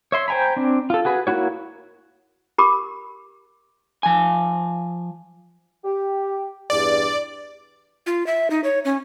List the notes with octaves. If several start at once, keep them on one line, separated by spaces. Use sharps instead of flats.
C#5 E5 C6
C5 G5 G#5 A#5 B5
C4 D4
F4 A4
F#4 G#4 B4
A#3 C#4 E4 F#4 C#5
G4 A#4 B5 D6
F3 G#5
G4
E2 G2 D5
F4
E5
D#4
C#5
C#4